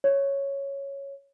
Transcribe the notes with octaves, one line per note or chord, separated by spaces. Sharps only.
C#5